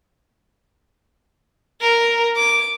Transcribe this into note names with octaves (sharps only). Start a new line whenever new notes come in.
A#4
D6